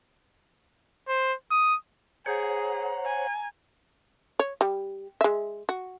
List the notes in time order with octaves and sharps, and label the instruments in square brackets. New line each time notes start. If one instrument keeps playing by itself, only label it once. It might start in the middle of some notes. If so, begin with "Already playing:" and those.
[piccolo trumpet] C5
D#6
[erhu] G#4 [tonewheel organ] C5 C#5 F#5 [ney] A#5
[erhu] G#5
[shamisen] C#5
G3
G#3 E5
F#4